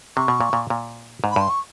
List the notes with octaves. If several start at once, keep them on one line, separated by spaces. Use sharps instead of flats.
C3 C#6
B2
A#2
A#2
A#2
G#2
B5
G2 C6
C#6